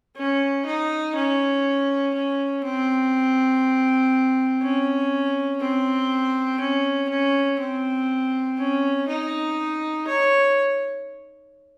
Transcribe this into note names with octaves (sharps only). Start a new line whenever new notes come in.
C#4
D#4
C#4
C#4
C4
C#4
C4
C#4
C#4
C4
C#4
D#4
C#5